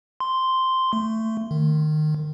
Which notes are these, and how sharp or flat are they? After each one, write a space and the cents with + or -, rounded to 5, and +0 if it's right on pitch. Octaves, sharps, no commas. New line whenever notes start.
C6 -5
A3 +15
D#3 -25